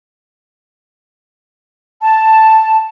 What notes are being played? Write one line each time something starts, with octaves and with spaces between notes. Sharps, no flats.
A5